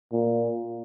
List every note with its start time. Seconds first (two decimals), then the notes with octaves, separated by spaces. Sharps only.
0.13 A#2